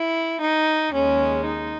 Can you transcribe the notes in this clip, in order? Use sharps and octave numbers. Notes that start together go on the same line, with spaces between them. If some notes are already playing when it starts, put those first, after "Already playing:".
Already playing: E4
D#4
D#2 C#3 G#3 C#4
D#4